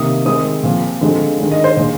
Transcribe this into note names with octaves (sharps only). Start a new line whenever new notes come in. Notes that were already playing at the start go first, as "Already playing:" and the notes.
Already playing: C3 D#3 A#3 D#6
D#3 G#3 C4 D#6
A#2 F3 C4
D3 F3 G#3 C4
D#3 G#3 D4
D#5
C5
A#2 G#3 D4